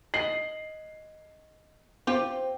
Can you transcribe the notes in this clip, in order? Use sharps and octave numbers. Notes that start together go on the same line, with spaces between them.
D#5 C7 F#7
C4 F4 G4 G5